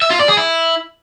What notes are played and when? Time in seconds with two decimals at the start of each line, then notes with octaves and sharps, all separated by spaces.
0.02 E5
0.10 F4
0.19 D5
0.28 G#4
0.37 E4